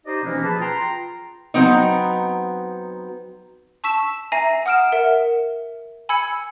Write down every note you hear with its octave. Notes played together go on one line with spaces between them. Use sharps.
D#4 G4 C5 D5 D#5
B2 E3 F3 A#3 B3 C#4
G#4 B4 A5
F4 G5 A#5 C6
F#3 B3 C4 D#4
A5 C#6 E6 B6 E7
E5 G#5 A#5 A#6 C7 D#7
F#5 D#6 F6 D7 E7
A#4 E5 F#5
G#5 B5 E6 G#6 C#7